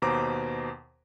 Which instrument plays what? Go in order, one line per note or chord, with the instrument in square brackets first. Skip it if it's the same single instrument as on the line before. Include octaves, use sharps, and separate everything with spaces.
[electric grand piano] D#2 B2 C5 A#5 D6